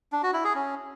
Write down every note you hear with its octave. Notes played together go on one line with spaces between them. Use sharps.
D4
F#4
E4
G#4
C#4